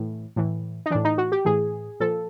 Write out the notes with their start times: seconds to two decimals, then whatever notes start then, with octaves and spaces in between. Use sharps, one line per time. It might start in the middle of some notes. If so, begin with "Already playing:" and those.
Already playing: A2 E3
0.36 A2 E3
0.86 D#4
0.90 A2 E3 D4
1.05 D#4
1.18 F#4
1.32 G4
1.45 A2 E3 G#4
2.00 A#2 F3 A4